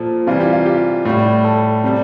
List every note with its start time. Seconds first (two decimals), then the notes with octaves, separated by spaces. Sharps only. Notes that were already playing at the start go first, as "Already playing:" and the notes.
Already playing: A#2 F3 A4
0.27 C3 E3 G3 F4
0.40 G4
0.53 F4
0.66 G4
1.05 A2 G3
1.44 A4
1.84 C3 G3